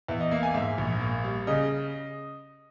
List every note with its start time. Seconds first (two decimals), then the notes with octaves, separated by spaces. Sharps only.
0.08 E2 E5
0.20 D#5
0.31 A#3 E5
0.43 G#5
0.54 G#2 E5
0.78 A#1
1.00 A#3
1.24 G3
1.47 C#3 D#5